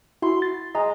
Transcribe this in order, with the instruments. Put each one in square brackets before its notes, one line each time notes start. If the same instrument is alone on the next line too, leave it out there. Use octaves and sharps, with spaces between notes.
[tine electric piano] E4 F#4 [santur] C6
[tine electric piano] A6
[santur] G#3 [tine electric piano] D#5 A#5